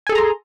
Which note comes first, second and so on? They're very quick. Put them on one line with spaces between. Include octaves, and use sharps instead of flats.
G#5 A4 G#4 A#5 C6